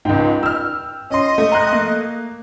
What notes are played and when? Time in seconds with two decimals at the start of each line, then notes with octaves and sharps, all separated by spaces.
0.05 C#2 G#2 G5
0.43 E6 F6
1.10 C#4 D#5 C6
1.38 A3
1.52 A#5 C6 F#6
1.73 A#3